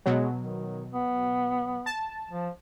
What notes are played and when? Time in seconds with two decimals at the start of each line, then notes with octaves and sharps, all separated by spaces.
0.06 B2 F#3 G#3
0.38 D#3
0.92 B3
1.86 A5
2.30 F3